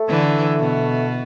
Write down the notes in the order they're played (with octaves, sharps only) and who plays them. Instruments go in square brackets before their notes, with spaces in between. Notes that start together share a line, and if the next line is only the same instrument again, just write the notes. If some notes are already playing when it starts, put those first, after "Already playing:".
Already playing: [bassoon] A3
[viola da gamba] D3 E3
B2